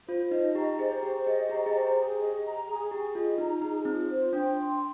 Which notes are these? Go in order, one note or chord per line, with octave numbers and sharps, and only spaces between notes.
F4 C5
D#4 D#5
G4 A#5
G#4 C5
G4 C5
G#4 D#5
G4 A#5
G#4
G4 C5
G#4
D#5
A#5
G#4
G4 G#4
F4 D#5
D#4 A#5
D#4 G#4
C4 F4
C5
D4 G5
C6